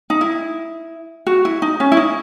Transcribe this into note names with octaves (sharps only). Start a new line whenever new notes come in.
D#4
E4
F#4
E4
D#4
C#4
E4
D#4